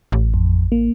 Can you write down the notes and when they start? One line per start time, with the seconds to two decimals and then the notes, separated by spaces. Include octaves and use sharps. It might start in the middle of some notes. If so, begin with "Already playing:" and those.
0.12 A1
0.34 F2
0.72 A#3